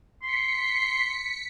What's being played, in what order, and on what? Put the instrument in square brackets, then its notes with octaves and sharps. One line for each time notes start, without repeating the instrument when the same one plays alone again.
[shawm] C6 [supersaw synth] B6 C#7